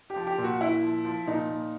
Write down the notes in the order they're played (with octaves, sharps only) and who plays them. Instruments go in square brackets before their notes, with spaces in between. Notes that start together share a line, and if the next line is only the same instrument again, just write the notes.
[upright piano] G4
F3
G4
A#2
F#4
A#2 E4
F3
F3
A#2 D#4
A#2